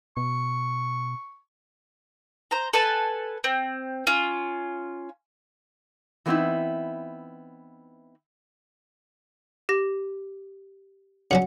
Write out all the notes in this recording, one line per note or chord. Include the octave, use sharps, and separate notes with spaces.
B2 C#6
C5 A#5
A4 B4 G#5 A5
C4
C#4 F4
E3 F#3 B3 C4 D#4 E4
G4 A#6
C#3 F#3 C#4 F#5